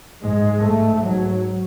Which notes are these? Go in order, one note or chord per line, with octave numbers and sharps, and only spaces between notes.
G#2 G#3
G#2 A3
G#2 F#3